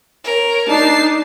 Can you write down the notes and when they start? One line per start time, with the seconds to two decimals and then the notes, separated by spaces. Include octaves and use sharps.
0.24 A#4 C#5
0.68 D4 D#4 A5 C7